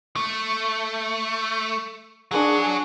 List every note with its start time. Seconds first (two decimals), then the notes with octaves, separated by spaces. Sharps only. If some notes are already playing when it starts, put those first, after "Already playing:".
0.16 A3
2.31 F#3 D4 F#4 G#4